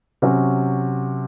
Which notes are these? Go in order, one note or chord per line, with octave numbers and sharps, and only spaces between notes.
C3 F#3 C#4